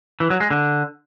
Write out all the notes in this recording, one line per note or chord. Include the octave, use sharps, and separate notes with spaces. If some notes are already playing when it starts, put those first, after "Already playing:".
E3
F#3
G#3
D3